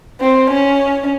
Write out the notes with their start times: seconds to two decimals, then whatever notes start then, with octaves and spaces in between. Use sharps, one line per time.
0.20 C4
0.50 C#4